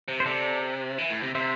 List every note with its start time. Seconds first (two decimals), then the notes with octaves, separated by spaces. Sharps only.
0.08 C3
0.20 C5
0.26 C3 A4 D5
0.98 E3
1.10 A2
1.23 C3
1.35 C3 C5 E5